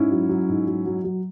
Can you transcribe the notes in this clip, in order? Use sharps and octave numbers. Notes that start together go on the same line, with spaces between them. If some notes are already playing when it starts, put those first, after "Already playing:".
Already playing: G#2 C#4 E4
F#3
F#3
G#2
F#3
F#3
F#3